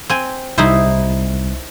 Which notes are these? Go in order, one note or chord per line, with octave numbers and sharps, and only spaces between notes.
C4 G#5
C2 D#4 E4 C5